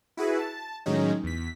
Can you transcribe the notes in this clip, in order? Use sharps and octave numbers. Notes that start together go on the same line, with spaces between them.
E4 F#4 G#4 B4
A5
A2 D#3 F#3 G#3 C#4 D#4
E2 B6